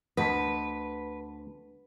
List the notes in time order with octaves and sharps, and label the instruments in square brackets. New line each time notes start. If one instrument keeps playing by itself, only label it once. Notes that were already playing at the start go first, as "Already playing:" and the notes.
[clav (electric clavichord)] D2 D#5 [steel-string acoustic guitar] B4 [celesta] F#5 A5 B6